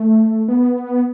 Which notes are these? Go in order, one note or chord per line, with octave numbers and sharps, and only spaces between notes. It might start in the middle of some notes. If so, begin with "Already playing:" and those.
Already playing: A3
B3